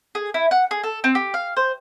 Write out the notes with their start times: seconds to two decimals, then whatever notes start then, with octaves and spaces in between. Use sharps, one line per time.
0.15 G#4
0.34 E4
0.51 F#5
0.71 G#4
0.83 A4
1.04 C4
1.15 G4
1.34 F5
1.57 C5